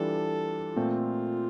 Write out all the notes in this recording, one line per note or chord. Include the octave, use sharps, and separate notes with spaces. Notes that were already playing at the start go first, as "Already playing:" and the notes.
Already playing: E3 G3 D4 F4 A4
A#2 A3 C4 F4